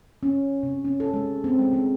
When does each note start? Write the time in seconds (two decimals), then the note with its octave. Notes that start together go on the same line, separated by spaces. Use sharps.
0.23 C#4
0.63 C3
0.85 C#4
1.00 A4
1.14 G#3
1.44 C4
1.59 G#3
1.73 G#3